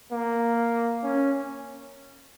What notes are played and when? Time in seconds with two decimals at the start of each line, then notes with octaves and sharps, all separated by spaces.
0.12 A#3
1.03 C#4